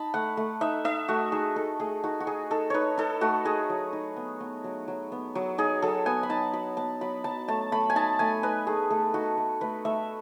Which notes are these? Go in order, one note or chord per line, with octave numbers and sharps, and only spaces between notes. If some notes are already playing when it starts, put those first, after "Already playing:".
Already playing: D#4 A5 B5
A3 F#5
A3
D#4 E5
D#4 E5
A3 F#4
D#4 G#4
D#4 A4
A3 G#4
D#4 F#4
F#4
D#4 G#4
D#4 A4
D#4 B4 C#5
D#4 A4
A3 F#4
D#4 G#4
F#3
D#4
B3
B3
F#3
F#3
B3
F#3
D#4 G#4
F#3 A4
B3 G#5
B5
D#4 A5
F#3 B5
B3 A5
F#3 B5
F#3 A5
A3 A5
A3 B5
G#5
D#4 A5
A3 G#5
D#4 B4
A3 G#4
A3 A4
D#4 F#4
A3
A3 B4
A3 E5